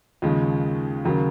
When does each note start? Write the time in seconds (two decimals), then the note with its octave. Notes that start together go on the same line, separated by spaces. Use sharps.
0.22 D#2 C#3 F3 G#3
1.05 D#2 C#3 F#3 A#3